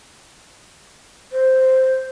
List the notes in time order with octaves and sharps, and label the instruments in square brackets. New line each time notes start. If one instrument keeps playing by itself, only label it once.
[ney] C5